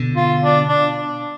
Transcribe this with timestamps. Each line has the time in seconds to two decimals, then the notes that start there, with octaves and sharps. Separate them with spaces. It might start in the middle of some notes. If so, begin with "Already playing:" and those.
Already playing: B2 D3
0.16 F4
0.42 D4
0.68 D4